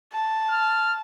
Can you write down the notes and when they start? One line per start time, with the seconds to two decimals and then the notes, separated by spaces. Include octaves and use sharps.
0.13 A5
0.50 F6